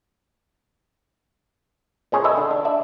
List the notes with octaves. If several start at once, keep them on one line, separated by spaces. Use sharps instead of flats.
A#2 C#4 G#4 C5 C#5
A4 B4 C#5 D#5 E5
D3
D4
D5 E5 A5